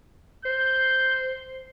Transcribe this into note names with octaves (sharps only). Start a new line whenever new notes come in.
C5 G6